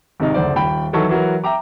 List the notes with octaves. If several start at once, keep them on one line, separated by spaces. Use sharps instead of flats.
G#1 C3 D#3 D#4
F#1 D2 C5 D5
D#1 G5 B5
D#3 E3 F#3 A4 C#6
E3 F#3 F#4 A#4
E5 G5 A#5 D6